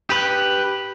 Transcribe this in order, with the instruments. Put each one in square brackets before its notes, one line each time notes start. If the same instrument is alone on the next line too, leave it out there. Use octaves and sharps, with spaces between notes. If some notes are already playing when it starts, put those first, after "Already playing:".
[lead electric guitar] G4 B4